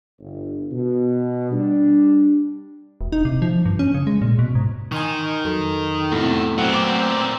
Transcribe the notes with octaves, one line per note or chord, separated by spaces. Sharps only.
G1
B2
G3 D4
E1
D#4
C3
F3
G2
C#4
C#3
G#3
A#2
B2
G#2
D#3 D#4 G#5 C6 C#6
F2 F#3 A4
E2 A2 C3
A#2 E3 F#3 A3 B3 C4 F#5
D6